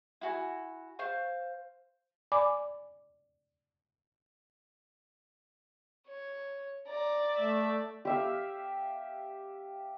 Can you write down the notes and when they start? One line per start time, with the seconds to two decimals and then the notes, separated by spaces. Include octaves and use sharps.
0.21 E4 F#4 G#5
0.99 C5 F5 C#6
2.32 D5 G#5 B5 D6
6.09 C#5
6.88 D5 A#5
7.37 A3 E5
8.05 G4 E5 F5